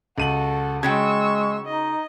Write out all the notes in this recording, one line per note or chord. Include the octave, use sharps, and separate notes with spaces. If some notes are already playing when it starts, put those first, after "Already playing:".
C#2 F#4 A4 D#7 F#7
C#3 G#3 F#4 G5 C#6 E6 G#6
D#4 D#5